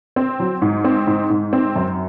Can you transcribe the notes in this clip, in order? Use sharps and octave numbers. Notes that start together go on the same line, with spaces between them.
C4
F#3
G#2
C4
G#2
G#2
C4
F#2